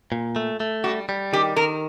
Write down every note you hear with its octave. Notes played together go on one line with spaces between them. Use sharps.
A#2
A3
A3
G3 F#4
G3
D#3 G4
D#3 A#4